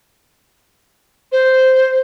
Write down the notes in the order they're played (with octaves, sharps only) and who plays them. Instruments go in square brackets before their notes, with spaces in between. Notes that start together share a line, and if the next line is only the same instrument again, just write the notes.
[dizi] C5